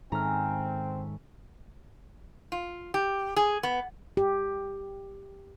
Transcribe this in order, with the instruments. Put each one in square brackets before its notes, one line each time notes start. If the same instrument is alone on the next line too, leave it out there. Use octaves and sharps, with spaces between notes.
[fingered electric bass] G#2 D#3 [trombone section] C4 [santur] C#4 A4 E5 [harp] A#5 F6
[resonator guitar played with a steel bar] F4
G4
G#4
B3
[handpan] G4